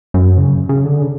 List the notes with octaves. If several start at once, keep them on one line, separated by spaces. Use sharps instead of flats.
F#2
C#3
C#3
D3
C#3